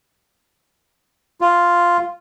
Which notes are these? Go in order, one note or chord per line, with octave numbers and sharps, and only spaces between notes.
F4